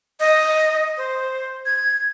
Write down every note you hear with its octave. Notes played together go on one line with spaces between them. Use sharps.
D#5
C5
G#6